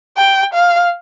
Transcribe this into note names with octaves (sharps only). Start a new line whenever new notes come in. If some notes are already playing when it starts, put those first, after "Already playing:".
G5
F5